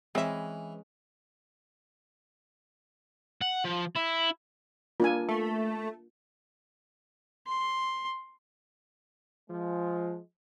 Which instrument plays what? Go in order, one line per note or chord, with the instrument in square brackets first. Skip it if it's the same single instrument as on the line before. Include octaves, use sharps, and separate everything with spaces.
[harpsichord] E3 [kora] G#3 C#4 B4 [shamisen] C4 E5
[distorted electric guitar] F#5
F3
E4
[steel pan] A#3 D4 G#5 [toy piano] F4
[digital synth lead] A3
[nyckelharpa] C6
[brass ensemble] F3 G#3